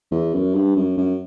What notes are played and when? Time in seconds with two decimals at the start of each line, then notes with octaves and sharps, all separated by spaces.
0.11 E2
0.33 F#2
0.55 G2
0.76 F#2
0.98 F#2